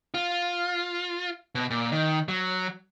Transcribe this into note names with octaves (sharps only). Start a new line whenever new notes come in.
F4
B2
A#2
D#3
F#3